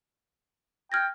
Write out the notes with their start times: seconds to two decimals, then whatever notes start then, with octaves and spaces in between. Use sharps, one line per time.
0.92 G5 F6 G#6 A#6